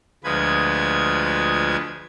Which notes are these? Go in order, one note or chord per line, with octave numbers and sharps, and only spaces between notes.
D2 F3 G#3 B4 G#6